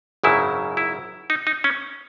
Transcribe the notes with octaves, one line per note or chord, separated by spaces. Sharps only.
G#1 F#2 C#3 F#3 E4
E4
D#4
D#4
C#4